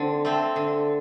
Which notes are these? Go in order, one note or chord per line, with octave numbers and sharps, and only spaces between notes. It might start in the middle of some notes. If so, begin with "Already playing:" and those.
Already playing: D3 C4
A3 C4
D3